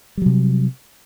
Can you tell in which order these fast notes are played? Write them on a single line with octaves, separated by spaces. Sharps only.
G3 F#3 C3